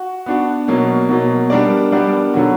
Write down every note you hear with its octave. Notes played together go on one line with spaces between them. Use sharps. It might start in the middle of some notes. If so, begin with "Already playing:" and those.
Already playing: F#4
B3 D4 F#4
B2 F#3 A#3
B2 F#3 A#3
G3 B3 D4 A#4 D5
G3 B3 D4 A#4 D5
D3 F#3 B3 F#4